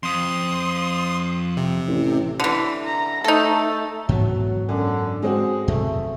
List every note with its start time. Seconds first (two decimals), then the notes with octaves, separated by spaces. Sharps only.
0.03 F2 C6 D#6
1.57 C3
1.87 A1
2.40 D3 E3
2.86 A#5
3.24 A3 D#4 A4
4.09 G#2 E3 F#3 B3
4.69 F#2 D3
5.22 G#3 C4 F#4 G#4
5.68 F#2 C3 A3